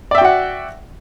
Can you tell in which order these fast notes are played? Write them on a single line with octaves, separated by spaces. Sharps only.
D5 E5 G5 F#4 F#5